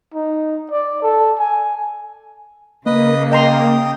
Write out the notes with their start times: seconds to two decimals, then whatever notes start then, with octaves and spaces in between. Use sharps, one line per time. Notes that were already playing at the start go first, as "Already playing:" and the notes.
0.14 D#4
0.71 D5
1.02 A4
1.39 G#5
2.86 C#3 A#3 B4 D#5
3.32 D#5 G5 A#5 C6 D#6